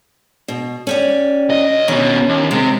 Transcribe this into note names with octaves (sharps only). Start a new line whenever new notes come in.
B2
C#4 G4 D5
B1 D#5
D#2 B2 C#4
D#2
C3 G#3